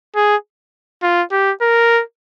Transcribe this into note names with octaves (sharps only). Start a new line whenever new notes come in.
G#4
F4
G4
A#4